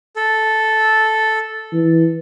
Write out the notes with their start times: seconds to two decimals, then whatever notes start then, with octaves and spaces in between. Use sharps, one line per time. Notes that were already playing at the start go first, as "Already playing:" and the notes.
0.16 A4
1.73 E3